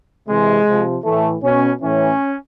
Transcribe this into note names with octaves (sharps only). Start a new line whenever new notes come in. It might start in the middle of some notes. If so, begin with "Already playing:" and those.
C3 E3 G#3
C3 F3
A2 E3 A3
B2 C#4
A2 E3 C#4